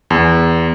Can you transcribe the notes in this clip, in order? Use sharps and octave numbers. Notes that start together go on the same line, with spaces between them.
E2